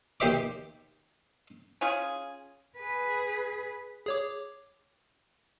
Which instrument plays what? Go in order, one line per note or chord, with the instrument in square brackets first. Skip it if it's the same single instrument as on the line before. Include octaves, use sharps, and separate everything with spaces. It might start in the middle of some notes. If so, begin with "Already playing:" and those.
[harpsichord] D#2 G4 C5 E5 D6
[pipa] C#4 F4 G#4
[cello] G#4 B4
[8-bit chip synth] G#4 C#5 D6